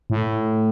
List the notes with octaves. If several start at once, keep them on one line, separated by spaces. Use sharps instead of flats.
A2